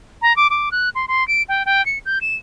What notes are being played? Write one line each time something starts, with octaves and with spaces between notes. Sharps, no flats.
A#5
D6
D6
F#6
C6
C6
D7
G5
G5
C#7
G6
E7